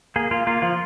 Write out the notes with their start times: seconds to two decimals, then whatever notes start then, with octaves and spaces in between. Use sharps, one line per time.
0.16 A#3 G#4
0.31 A#3 F4
0.47 A#3 F4
0.62 F3 F4